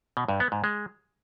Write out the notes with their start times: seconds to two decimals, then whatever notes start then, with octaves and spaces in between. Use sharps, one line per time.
0.17 B2
0.28 G2
0.40 B3
0.52 G#2
0.64 G#3